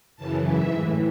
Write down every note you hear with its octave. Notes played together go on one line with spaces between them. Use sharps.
F#2 C#3 E3 A5
G#2 E3 E5
A2 E3